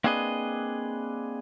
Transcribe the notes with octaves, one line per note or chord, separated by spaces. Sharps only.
A#3 C4 D4 G#4 B4 D#5